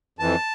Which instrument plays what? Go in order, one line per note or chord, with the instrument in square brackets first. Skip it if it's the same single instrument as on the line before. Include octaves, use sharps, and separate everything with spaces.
[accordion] F2 E3 A5